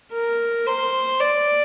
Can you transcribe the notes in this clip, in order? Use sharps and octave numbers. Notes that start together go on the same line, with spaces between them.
A#4
C5
D5